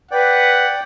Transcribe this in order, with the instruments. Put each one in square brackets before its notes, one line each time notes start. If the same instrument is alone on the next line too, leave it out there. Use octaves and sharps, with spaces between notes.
[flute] B4 [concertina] D5 G5 [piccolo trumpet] F#5